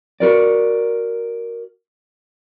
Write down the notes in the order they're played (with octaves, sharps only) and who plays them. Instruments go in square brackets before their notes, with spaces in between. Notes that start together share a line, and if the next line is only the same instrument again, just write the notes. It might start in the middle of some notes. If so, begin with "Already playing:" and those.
[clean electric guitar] F#4 A#4 D5